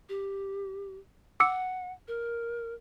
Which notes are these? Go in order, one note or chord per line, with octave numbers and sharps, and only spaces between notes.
G4
F#5 D6 E6 C#7
A#4